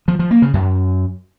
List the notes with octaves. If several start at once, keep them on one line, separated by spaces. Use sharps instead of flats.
F3
F3
A#3
C#3
F#2